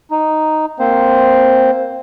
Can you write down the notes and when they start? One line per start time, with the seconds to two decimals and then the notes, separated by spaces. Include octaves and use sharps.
0.11 D#4
0.79 A#3 C4 C5